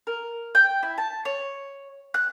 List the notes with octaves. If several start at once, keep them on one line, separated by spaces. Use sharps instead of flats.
A#4
G5
E4
A5
C#5
F#6